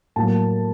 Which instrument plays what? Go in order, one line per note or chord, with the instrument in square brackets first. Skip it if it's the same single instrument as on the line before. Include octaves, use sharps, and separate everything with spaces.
[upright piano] A2 F#3 A#3 A5